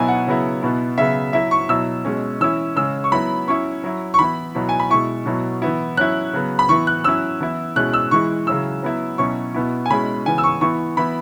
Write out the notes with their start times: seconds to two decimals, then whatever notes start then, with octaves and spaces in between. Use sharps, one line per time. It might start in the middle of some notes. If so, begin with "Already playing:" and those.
Already playing: B2 F#3 B3 E4 G#5
0.08 F#5
0.27 C#3 F#3 B3 E4
0.62 B2 B3 E4
0.98 C#3 F#3 B3 E5
1.33 F#3 E4 E5
1.51 C#6
1.69 B2 F#3 E4 E6
2.05 B2 G#3 C#4
2.40 E3 C#4 E4 E6
2.76 C#3 G#3 C#4 E6
3.04 C#6
3.12 F#3 B3 E4 B5
3.47 F#3 C#4 E4 C#6
3.84 F#3 E4
4.14 C#6
4.19 E3 B3 E4 B5
4.55 B2 F#3 B3 E4
4.69 G#5
4.80 B5
4.90 B2 G#3 E4 C#6
5.26 B2 F#3 B3 E4
5.62 E3 B3 E4
5.97 F#3 C#4 E4 F#6
6.33 C#3 F#3 B3
6.59 B5
6.69 E3 B3 E4 C#6
6.87 F#6
7.04 F#3 C#4 E4 E6
7.40 E3 B3 E4
7.76 B2 G#3 C#4 E4 F#6
7.93 E6
8.11 E3 G#3 E4 C#6
8.47 C#3 F#3 C#4 E4 E6
8.83 F#3 B3 E4
9.18 B2 F#3 C#4 E4 C#6
9.54 B2 B3 E4
9.86 G#5
9.90 B2 G#3 C#4 E4 B5
10.26 C#3 E3 B3 G#5
10.38 E6
10.44 C#6
10.61 E3 B3 E4 C#6
10.97 E3 B3 E4 B5